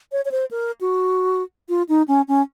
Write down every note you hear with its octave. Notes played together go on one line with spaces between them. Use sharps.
C#5
C#5
C5
A#4
F#4
F4
D#4
C#4
C#4